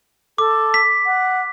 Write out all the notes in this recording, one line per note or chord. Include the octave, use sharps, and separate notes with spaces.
A4 D6
B6
F#5